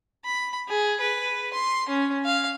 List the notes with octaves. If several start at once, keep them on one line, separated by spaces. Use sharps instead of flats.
B5
G#4
B4
C6
C#4
F5